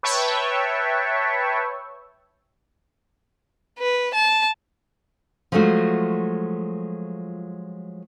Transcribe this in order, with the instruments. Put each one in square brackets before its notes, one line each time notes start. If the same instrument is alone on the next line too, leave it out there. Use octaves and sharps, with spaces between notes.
[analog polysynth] B4 C#5 E5 G5 A5 C#6
[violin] B4
A5
[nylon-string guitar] F3 F#3 G#3 A3 F4 F#4